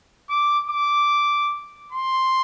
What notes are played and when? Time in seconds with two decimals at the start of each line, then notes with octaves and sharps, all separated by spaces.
0.29 D6
0.69 D6
1.92 C6